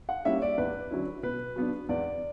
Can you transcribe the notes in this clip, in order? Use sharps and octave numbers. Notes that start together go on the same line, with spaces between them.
F#5
G3 A#3 C#4 E4 E5
D5
E2 B4
D3 F#3 C#4 E4
B2 B4
F#3 B3 D4
E2 D5